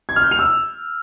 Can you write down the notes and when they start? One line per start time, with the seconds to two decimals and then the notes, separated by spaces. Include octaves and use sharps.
0.09 G#6
0.16 F6
0.24 G6
0.31 F7
0.39 E6